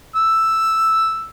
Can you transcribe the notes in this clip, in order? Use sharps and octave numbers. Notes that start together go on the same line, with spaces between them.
E6